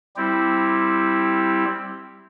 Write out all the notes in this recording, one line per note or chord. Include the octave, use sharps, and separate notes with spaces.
G3 C4 E4 G4